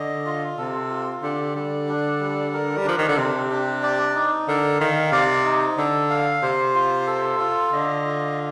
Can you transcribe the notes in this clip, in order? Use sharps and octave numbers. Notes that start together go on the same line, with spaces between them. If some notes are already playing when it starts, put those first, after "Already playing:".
Already playing: D3 D#5
F4
C3 A4
F4
D3 G4
D3 G3
D4
G3
A#4
G3
F3 D4
D#3
D3
C3 G4
D4
D5
D#4
D3 A#4
D#3 F5
C3 D5
D#4
D3 A4
F5
C3 C5
F4
A4
F4
D3 D#5
F4